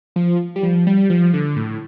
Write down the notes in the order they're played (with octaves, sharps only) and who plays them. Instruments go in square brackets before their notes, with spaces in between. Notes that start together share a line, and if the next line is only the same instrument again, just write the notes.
[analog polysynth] F3
G3
F3
G3
F3
D3
A2